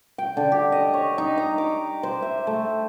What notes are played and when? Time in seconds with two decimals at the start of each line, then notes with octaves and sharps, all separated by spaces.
0.18 G5
0.37 D3
0.52 G4
0.72 D#5
0.94 C#5
1.18 D#4
1.38 A#5
1.58 D6
2.03 C5
2.22 E5
2.47 A3